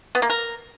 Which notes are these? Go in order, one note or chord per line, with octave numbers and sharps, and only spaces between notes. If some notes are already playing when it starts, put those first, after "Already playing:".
B3
A#3
A#4